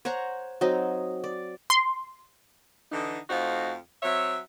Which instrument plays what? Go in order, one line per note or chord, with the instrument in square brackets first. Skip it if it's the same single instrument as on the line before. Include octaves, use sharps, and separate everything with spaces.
[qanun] C5 C#5 F#5 A#5
F#3 C4 D#4 D#5
D5
[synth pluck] C6
[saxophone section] D3 E3 D#4
F2 A3 D#4 F#4 C5 F5
F#3 C4 C#5 E5